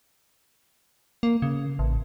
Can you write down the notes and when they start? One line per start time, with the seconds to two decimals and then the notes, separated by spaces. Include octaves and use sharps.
1.23 A#3
1.42 C#3
1.79 A1